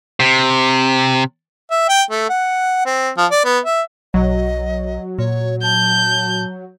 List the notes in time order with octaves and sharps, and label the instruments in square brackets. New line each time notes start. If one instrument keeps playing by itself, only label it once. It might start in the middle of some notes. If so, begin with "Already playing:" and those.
[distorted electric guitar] C3
[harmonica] E5
G5
A3
F#5
C4
F3
D5
B3
E5
[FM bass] B1 [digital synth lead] F#3 [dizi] D#5
[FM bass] A#2 [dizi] C#5
[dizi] A5 [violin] G6